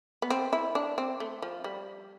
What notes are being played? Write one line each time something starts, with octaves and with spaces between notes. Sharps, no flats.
B3
C4
E4
D4
C4
A3
F3
G3